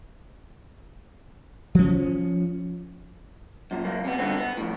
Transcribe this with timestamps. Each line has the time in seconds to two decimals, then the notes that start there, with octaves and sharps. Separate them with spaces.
1.75 F3 C#4
3.71 F#2 A#2
3.84 C#2 F#2 A#3
4.05 C3 B3
4.18 G2 D3 B3 C4
4.38 B3
4.57 F2 A2